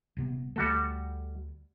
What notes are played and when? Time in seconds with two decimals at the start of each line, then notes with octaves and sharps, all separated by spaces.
0.17 D#1 C3 B3
0.56 D2 D3 G3 A3 F#4 A4